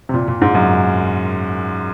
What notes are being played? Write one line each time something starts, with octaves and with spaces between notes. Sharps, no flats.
C3
A#2
A#2
G#2
F#2